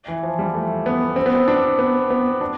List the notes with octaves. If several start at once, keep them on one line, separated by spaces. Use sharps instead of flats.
E3
F3
G3
A3
B3
C4
B3
C4
D4
B3
B3
D4